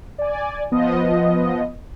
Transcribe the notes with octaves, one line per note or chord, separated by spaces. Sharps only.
D5 G#5
F3 B3 D#5